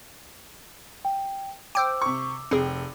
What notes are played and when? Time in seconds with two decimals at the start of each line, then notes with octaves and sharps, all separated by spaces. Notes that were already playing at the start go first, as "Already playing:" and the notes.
1.05 G5
1.75 C5 G5 D6 E6
2.02 C3 C#6
2.51 F1 C4 G#4